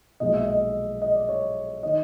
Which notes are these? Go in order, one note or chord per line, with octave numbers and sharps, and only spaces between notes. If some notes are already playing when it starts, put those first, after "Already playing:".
B1 A#2 F3 G#3 D#5
E5
D#5
D#5
D5
C#5
D#3 D#5